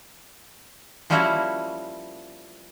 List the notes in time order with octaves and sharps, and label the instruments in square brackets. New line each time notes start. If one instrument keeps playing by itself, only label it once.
[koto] F3 G3 A#3 C#4 E4 F#4